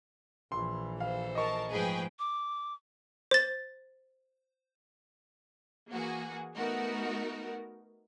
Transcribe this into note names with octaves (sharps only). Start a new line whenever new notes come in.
A#1 E3 C6
A4 C5 F5
A#4 D#5 A5 C#6
G#2 F3 A3 G#4 B4 G5
D6
C5 A6
E3 A#3 F#4 G#4
A3 B3 D#4 F#4 A#4